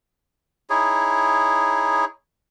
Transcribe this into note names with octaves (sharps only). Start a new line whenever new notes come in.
D#4 E4 G#4 C#5